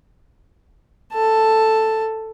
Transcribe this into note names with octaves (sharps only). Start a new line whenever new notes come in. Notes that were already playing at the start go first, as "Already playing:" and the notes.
A4 A5